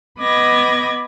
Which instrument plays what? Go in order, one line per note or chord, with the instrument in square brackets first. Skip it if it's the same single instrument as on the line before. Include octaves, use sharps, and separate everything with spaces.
[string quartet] B3 D#5 B5 D6 G#6 A#6